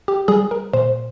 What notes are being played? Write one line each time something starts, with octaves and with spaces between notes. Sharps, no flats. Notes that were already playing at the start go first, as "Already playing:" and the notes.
G4
G3 G#4
A#4
A#2 C5